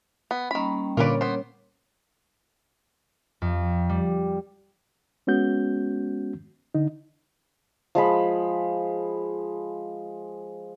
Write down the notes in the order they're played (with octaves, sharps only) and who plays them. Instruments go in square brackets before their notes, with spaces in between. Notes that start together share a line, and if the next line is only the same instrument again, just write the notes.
[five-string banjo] B3
[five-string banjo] D#3 B5 [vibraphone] G3 A#3 C#4
[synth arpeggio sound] A#2 D3 [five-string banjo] F4 B4 [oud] A#4 C#5 D5
[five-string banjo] B3 C5
[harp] F2
G3
[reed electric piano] G#3 B3 C#4 F#4 G6
D3 D#4
[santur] F3 G#3 B5